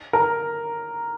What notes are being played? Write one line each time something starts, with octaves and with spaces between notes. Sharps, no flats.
A#4